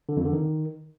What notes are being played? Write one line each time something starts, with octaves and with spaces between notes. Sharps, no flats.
D3
F2
D3
D#3